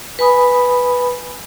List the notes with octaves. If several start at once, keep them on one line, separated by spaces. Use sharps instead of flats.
B4 G#5 B5 D#6